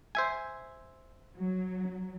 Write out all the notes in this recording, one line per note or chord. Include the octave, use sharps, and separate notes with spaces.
C5 E5 G#5
F#3